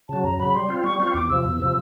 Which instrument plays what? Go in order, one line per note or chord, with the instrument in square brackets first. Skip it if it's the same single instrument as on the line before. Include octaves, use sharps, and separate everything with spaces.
[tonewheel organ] C#3 F#3 [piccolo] A5
[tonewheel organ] F#2 [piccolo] A#5
[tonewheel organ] C#3 F#3 [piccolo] B5
[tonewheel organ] G3 [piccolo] C6
[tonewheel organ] C4 F4
[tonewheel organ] G3 [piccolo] C#6
[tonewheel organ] C4 F4 [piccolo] C#6
[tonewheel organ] E2 [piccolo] D6
[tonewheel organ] C3 F3 [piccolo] E6
[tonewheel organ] E2
C3 F3